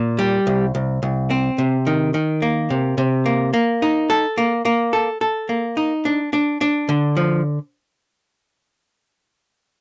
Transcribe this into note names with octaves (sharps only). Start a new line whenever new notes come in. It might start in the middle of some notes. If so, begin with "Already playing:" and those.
Already playing: A#2
G3
C2
C2
C2
C4
C3
D#3
D#3
A#3
C3
C3
A#3
A#3
D#4
A4
A#3
A#3
A4
A4
A#3
D#4
D4
D4
D4
D3
F3